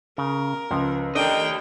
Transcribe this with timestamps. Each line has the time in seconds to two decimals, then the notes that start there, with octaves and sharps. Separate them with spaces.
0.18 C#3 A#4
0.71 C#2 F3
1.15 D4 G4 A4 A#4 D#5 G5